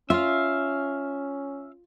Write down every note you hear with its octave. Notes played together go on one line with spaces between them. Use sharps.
C#4 F4 E5 F5